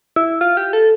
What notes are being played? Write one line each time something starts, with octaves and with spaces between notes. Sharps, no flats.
E4
F4
G4
A4